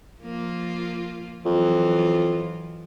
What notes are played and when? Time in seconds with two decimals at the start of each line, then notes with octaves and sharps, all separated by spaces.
0.21 F3 A#3 F4
1.45 F2 E3 F#3 F4